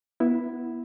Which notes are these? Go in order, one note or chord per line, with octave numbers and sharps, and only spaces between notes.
B3 E4